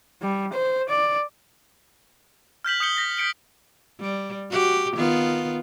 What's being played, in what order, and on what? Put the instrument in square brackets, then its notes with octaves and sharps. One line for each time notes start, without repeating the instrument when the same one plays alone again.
[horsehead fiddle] G3
C5
D5
[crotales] F6 G6 B6 F#7
D#6 G6 C#7 G7
G6 A#6 B6
G6 B6 C#7 D7 G7
[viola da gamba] G3
F#4 G4
D#3 B3 F4